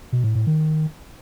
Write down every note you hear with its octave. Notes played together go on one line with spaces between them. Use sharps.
B2
A2
A2
D#3